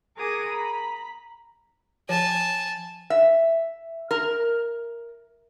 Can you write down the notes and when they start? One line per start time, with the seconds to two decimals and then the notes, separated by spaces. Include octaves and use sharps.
0.16 G#4 A#4 F#5 G#5 D6 D#6
0.47 A#5 B5
2.09 F3 G#5 A5
3.10 E5
4.11 A#4